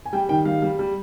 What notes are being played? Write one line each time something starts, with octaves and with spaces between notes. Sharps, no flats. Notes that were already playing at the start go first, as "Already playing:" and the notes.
G#5
G3 G5
D#3 G5
G3 F5
G3
G3